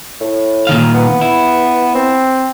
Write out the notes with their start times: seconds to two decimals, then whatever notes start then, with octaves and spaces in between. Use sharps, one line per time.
0.20 A2
0.67 A#2 D#3 F5
0.95 B3
1.21 E4
1.95 C4